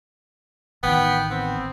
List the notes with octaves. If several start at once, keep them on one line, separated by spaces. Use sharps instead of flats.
A1 D#3 B3 G5
B3 C4